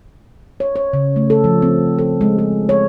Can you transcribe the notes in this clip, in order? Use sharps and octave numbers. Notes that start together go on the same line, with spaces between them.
C#5
C#5
C#3
A3
A4
F3
C4
A4
G#3
G#4
C#5